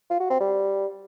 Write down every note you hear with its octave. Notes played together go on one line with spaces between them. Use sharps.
F4
F#4
C4
G3